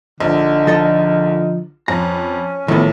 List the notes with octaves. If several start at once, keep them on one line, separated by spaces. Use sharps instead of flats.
A#1 D3 D#4
F3 A4 D#5
F2 C#4 A#5
A#1 A2 D#3 E3 B3